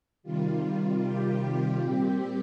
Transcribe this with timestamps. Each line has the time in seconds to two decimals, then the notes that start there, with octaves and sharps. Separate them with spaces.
0.23 C3 D#3 G3 F4
1.02 G4
1.80 A#2 G3 C4 G4